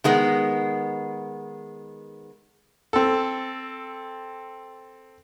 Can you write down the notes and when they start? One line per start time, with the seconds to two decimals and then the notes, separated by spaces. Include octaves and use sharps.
0.04 D#3 G#3 B3
2.93 C4 A4